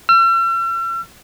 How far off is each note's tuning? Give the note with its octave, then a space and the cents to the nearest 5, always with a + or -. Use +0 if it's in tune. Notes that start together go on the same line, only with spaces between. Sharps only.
E6 +45